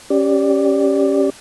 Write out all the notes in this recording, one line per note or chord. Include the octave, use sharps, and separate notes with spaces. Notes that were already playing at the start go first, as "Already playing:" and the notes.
C#4 G4 D5